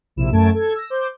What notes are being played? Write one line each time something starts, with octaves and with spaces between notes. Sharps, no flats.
A#1 C3 E4 E7
F#2 A3 A5 G#6 D7
A4 G#6
E6 A#6
C5 D6 G6